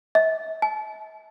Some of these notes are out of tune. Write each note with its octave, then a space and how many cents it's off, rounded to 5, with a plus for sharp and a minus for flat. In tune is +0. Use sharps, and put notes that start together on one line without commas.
E5 -45
A5 -40